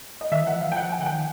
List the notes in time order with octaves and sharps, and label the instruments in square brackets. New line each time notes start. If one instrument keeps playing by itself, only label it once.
[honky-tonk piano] D#5
[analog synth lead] D#3 [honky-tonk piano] E5
[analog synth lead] E3
[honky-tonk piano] F#5
[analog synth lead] F3
[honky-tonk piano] F5
G5
F#5
G#5
[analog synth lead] D3 [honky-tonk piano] F#5
[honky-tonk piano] G5
[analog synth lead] D#3